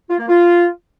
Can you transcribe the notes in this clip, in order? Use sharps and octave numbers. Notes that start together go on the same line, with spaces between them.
F4
A#3
F4